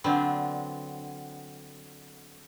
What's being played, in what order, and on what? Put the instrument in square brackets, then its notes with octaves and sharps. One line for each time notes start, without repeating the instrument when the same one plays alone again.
[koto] D3 F#3 B3 C4 D4